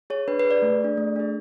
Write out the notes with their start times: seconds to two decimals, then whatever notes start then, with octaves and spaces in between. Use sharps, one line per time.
0.10 G#4 C#5
0.28 D4 B4
0.39 B4
0.45 G#4
0.51 D5
0.62 A3
0.80 D4 G#4
0.97 A3
1.16 D4 G#4